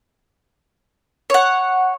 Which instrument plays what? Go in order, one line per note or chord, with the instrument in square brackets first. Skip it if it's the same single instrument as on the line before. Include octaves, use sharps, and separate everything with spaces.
[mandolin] C#5 F#5